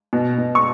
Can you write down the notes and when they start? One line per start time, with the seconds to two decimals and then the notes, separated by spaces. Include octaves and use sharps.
0.13 B2
0.39 B2
0.55 C#6